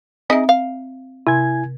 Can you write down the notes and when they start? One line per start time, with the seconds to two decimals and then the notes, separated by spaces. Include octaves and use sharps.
0.30 C4 D#4 G#4 D#5 E5
0.49 F5
1.27 C3 E4 G#5 G#6